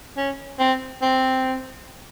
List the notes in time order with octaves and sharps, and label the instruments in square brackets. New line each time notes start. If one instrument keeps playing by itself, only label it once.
[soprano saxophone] C#4
C4
C4